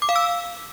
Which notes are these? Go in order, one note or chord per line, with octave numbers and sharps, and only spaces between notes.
D6
F5
E6